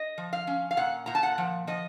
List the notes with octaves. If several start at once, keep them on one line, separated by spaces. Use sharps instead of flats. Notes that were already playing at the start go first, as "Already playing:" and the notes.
Already playing: D#5
F3
F5
C#4
F5
A#2 F#5
A#2 A#5
A5
F#5
F3
F3 D#5